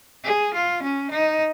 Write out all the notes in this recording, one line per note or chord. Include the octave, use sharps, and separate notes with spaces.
G#4
F4
C#4
D#4